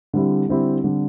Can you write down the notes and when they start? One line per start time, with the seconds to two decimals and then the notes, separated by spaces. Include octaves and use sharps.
0.14 D3 G3 C4 E4 G4
0.49 D3 G3 C4 E4 G4
0.84 D3 G3 C4